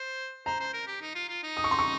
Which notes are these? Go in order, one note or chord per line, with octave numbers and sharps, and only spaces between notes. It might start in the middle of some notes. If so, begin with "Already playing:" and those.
Already playing: C5
C5 A#5
C5
A#4
G4
D#4
F4
F4
D#4
D#6
C#6
C6
C#6